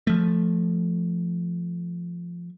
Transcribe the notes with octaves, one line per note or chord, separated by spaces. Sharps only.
F3 A3